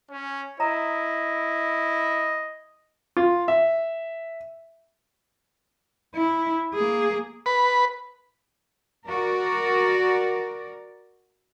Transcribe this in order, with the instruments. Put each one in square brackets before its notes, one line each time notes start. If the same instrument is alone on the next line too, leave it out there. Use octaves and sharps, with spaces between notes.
[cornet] C#4 [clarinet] C#5
[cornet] E4 [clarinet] D#5 [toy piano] A#5
[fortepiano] F4
E5
[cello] E4
A#3 G#4
[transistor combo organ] B4
[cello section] F#4 A#4 D5